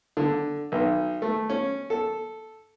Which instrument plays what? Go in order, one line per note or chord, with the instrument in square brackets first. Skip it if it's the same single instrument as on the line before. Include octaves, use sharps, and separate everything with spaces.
[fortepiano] D3
B1
A3
C#4
A4